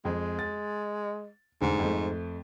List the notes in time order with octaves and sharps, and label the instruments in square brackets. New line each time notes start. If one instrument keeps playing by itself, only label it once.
[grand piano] F2 [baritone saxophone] G#3
[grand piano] A6
[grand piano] F1 D3 [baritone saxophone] G#2
[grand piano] F2 A3